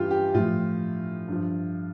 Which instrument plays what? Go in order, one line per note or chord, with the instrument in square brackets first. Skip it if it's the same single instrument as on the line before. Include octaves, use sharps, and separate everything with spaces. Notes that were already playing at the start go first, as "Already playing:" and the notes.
Already playing: [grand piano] G2 E3 G3 F4 G4
G4
A2 F3 F4
G2 F3